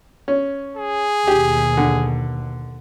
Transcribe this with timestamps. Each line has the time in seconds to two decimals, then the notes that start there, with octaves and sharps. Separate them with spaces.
0.28 C#4
0.77 G#4
1.27 D#2 B2 G4
1.77 D3